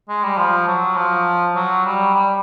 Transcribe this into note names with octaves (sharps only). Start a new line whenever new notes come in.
G#3
G3
F3
F#3
F3
F#3
G3
G3